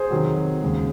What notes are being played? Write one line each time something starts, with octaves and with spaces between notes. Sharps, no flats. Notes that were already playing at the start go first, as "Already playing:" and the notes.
Already playing: G#4 C5
F2 C3 D#3 F#3
D#2 C#3 G#3